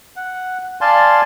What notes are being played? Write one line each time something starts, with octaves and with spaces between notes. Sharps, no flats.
F#5
D5 F5 G#5 A5 C6